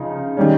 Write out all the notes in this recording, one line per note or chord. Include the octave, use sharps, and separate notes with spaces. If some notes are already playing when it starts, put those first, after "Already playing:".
Already playing: C#3 F3 D#4
D#3 G3 C#4